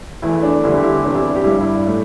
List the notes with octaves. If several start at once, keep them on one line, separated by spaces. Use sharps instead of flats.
E2 E3 A3 E4
D4
E2 D3 G3 E4
G4
E4
E2 C3 G3 D4
E4
G4
G2 G3 E4
D4
E4
A2 A3